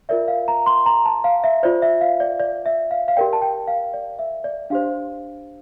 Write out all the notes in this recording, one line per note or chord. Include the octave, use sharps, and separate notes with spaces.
F4 A#4 D5 E5
F5
A#5
C6
A#5
A5
F5
E5
F4 C5 D5
E5
F5
D5
D5
E5
F5
F5
G4 A#4 D5 G5
A5
G5
F5
D5
E5
D5
D4 G4 C5 F5